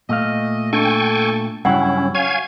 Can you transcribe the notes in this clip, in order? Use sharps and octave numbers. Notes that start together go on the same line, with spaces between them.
A#2 A3 D#5 F5
D4 A4 G5 G#5 C#6
G2 C#3 F#3 C#4 E4 F#5 G5
F#4 C#5 F5 G#5 G#6